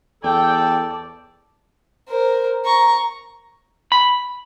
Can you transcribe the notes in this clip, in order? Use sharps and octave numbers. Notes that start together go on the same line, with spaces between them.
E2 A4 D5 G5 A5
A#4 C5
A#5 C#6
B5